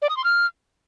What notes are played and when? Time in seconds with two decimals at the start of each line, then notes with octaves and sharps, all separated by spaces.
0.02 D5
0.09 D#6
0.17 C6
0.24 F6